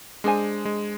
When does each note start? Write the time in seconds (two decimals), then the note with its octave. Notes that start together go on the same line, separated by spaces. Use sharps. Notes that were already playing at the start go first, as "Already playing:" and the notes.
0.24 G#3 D4 G#4 C5 G#5
0.65 G#3